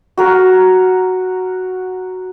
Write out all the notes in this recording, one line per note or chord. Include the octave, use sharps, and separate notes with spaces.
F#4 A#4